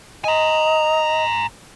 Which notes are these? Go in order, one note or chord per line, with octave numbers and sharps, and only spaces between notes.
D#5 G#5 A#5